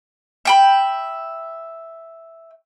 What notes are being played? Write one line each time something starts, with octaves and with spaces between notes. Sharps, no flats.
E5 G5 B5